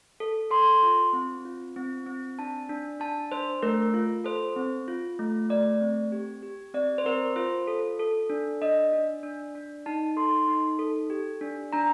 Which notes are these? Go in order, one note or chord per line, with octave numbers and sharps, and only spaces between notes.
A4
A4 C6
F4
C4
F4
C4
C4
D4 A5
D4
D4 A5
D4 C5
A3 A#4
F4
A4 C5
C4
F4
A3
A3 D5
C4
G4
G4
C4 D5
C5
C4 A#4
F4 C5
A4
A4
D4
D4 D#5
D4
D4
D4
D#4 A5
A4 C6
D#4
A4
G4
D4
D4 A#5